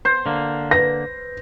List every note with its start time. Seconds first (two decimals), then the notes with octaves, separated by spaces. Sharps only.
0.05 C5
0.26 D3 A#3
0.71 B4 A#6